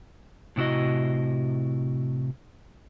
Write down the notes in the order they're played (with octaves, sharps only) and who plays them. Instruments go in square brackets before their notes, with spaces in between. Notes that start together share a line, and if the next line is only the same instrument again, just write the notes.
[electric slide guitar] A2 C3 E4 F#4 D#5